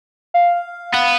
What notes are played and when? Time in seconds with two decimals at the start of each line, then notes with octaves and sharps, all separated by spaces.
0.34 F5
0.94 B3